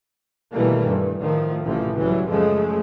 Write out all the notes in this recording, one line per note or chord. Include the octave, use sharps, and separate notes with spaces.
B2 D#3 E3 G3 A3 A#3
G2
A2 D#3 F3 A3
A1 A2 C3 E3 F3
C#2 E3 F#3 G3
F#2 C#3 F3 G#3 A3